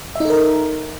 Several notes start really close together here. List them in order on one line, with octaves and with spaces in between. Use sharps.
E5 D#4 A4 A#4